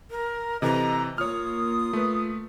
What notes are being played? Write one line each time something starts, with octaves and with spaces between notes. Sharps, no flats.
A#4
C3 E3 A4 D#5 A#5
A#3 F4 C#5 D#6 F6
A3 F4 B4